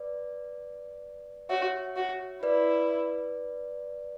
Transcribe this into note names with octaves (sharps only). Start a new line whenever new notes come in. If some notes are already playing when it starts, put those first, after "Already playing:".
Already playing: B4 D5
F#4 C#5 E5
F#4
E4 B4 D5